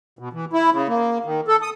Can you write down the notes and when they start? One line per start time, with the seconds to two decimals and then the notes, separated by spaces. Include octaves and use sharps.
0.19 B2
0.33 E3
0.53 E4
0.72 C#3
0.88 A#3
1.25 D#3
1.48 A4
1.62 D#6